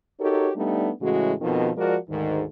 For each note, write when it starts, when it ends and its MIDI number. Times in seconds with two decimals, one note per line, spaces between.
0.20 0.51 63
0.20 0.51 66
0.20 0.51 67
0.20 0.51 69
0.20 0.51 70
0.20 0.51 73
0.56 0.90 55
0.56 0.90 57
0.56 0.90 59
0.56 0.90 62
0.56 0.90 63
1.01 1.33 45
1.01 1.33 49
1.01 1.33 52
1.01 1.33 56
1.01 1.33 66
1.41 1.70 41
1.41 1.70 47
1.41 1.70 51
1.77 1.97 53
1.77 1.97 56
1.77 1.97 66
1.77 1.97 70
1.77 1.97 74
2.10 2.44 38
2.10 2.44 44
2.10 2.44 51